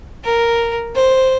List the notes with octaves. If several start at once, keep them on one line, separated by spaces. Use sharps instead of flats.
A#4
C5